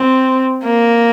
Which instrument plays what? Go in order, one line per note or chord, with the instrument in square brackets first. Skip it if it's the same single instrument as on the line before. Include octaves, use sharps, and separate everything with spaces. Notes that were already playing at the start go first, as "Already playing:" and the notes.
Already playing: [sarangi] C4
A#3